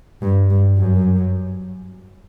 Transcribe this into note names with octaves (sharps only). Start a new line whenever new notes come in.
G2
G2
F#2